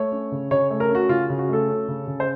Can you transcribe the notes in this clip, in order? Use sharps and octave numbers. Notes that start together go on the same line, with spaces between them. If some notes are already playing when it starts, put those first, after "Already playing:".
Already playing: A3 C#5
C#4
C#3
C#3 C#5
A3
A#4
C#4 F#4
C#3 F4
C#3
F#4
A3 A4
C#4
C#3
C#3
C5